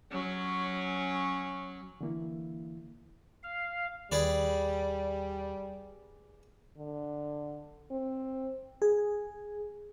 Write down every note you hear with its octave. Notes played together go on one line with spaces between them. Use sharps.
F#3 C#4
D3 E3 A#3 E4
F5
D#2 G3 G#4 B4 D5
D3
C4
G#4